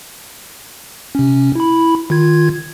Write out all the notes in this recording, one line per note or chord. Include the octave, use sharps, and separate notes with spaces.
C3 C#4
E4 B5
D#3 F4 G#6